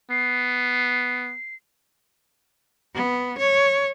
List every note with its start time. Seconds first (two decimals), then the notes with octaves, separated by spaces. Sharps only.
0.11 B3 C7
2.94 B3
3.38 C#5